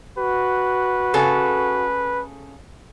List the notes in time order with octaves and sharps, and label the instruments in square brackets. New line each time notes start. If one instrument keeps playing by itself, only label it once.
[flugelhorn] F#4 [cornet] B4
[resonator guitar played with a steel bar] C#3 A4